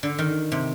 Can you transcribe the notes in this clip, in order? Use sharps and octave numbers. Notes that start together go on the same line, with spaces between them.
D3
D#3
C3